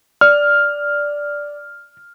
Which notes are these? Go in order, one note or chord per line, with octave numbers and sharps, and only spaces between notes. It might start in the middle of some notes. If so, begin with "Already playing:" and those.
D5 F6